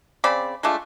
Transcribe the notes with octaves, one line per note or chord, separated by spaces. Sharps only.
C#3 C4 D5 B5
G#3 A3 D4 F4